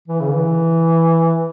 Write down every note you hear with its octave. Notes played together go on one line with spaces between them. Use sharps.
E3
C#3
E3